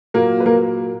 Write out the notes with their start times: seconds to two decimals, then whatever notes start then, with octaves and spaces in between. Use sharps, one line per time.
0.14 A#2 F#3 A#3 A#4
0.40 B4
0.46 A#3 A#4